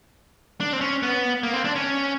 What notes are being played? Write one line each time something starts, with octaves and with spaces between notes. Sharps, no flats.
D4
C4
C#4
B3
A#3
C4
D4
C#4